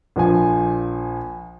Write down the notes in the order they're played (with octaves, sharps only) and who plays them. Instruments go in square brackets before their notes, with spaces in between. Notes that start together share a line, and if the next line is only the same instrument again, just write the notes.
[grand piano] A#1 F3 G#5